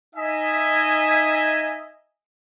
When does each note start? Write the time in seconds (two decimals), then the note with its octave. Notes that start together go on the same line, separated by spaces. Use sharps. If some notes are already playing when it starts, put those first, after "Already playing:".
0.16 D#4 D#5 E5 G#5